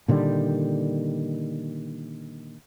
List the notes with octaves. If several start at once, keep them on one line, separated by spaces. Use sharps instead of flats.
A#2 D3 D#3 G3